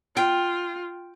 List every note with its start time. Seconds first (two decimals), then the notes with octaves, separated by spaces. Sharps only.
0.17 F4 G5